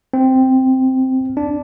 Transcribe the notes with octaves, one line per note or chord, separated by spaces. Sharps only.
C4
D4